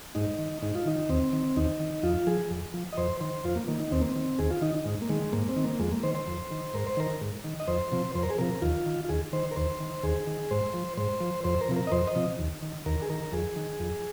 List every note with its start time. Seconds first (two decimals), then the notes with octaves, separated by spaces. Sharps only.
0.15 G#2 D#4
0.38 D#3
0.62 G#2 D#4
0.75 F4
0.86 D#3 D#4
1.09 D#2 C4
1.33 D#3
1.56 D#2 D#4
1.80 D#3
2.03 F2 F4
2.27 F3 G#4
2.51 F2
2.74 F3
2.93 D#5
2.97 F2 C5
3.20 D#3 C5
3.44 F2 F4
3.56 A#3
3.68 D#3 A#3
3.80 D#4
3.91 D#2 C4
4.02 A#3
4.12 D#3 C4
4.39 D#2 G#4
4.50 F4
4.62 D#3 D#4
4.75 D#4
4.85 G#2
5.02 A#3
5.09 D#3 G#3
5.32 G#2 A#3
5.48 C4
5.56 D#3
5.64 A#3
5.79 F2 G#3
5.92 A#3
6.03 D#3 C5
6.15 C5
6.28 F2
6.51 D#3
6.74 G#2 A#4
6.87 C5
6.97 D#3 A#4
7.21 G#2
7.44 D#3
7.60 D#5
7.68 F2 C5
7.92 C3 F3
8.15 F2 C5
8.23 A#4
8.30 G#4
8.38 C3 F3 A#4
8.62 D#2 F4
8.86 D#3
9.05 F4
9.09 D#2 G#4
9.33 D#3 C5
9.51 A#4
9.56 D#2 C5
9.80 D#3
10.03 D#2 G#4
10.27 D#3
10.51 G#2 C5
10.74 F3
10.97 G#2 C5
11.21 F3
11.44 F2 C5
11.61 A#4
11.69 C3 F3
11.76 A#4
11.87 D#5
11.92 F2 C5
12.07 D#5
12.16 C3 F3
12.39 D#2
12.62 D#3
12.86 D#2 A#4
13.02 G#4
13.09 D#3 A#4
13.32 F2 G#4
13.56 D#3
13.80 F2